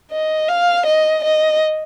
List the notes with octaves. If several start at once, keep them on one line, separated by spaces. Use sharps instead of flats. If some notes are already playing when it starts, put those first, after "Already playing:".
D#5
F5
D#5
D#5